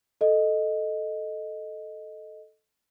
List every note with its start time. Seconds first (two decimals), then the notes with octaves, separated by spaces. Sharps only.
0.21 A4 D#5